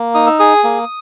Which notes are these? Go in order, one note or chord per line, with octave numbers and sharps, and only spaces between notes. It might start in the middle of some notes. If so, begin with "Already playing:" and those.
Already playing: A#3
D#4 D#6
E6
G#4 D#6
A#3